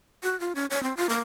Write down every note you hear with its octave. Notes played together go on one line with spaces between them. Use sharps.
F#4
F4
C#4
C#5
C4
F4
A#3